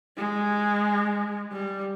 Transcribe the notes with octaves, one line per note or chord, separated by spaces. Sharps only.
G#3
G3